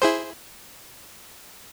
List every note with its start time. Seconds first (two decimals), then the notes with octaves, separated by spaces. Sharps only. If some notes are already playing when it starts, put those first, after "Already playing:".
0.02 E4 G#4 C5